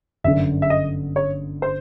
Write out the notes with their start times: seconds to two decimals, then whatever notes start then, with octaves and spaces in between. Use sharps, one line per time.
0.24 G1 F#2 D3 E5
0.62 E5
0.70 D#5
1.16 C#5
1.62 C5